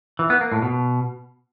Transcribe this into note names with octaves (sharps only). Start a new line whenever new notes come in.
E3
B3
A#3
A2
B2